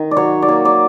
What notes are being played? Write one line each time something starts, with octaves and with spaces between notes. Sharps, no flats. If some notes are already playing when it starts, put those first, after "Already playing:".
Already playing: D#3
D5
F#3 C#5
D5
A#3 C#5
D5